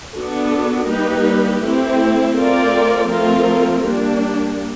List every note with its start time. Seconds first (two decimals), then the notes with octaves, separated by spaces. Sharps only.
0.14 B3 D4 F#4 A4
0.88 G3 A#3 D#4 G4 B4
1.61 A3 C4 E4 G4
2.36 A3 C4 F4 A#4 D5
3.09 F3 A3 C4 F4 A#4
3.83 G3 A#3 D4